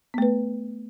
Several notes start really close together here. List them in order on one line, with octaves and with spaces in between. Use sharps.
B3 A3 B4